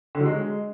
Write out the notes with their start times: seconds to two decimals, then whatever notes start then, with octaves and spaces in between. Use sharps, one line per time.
0.15 D3
0.20 F#3
0.26 G#3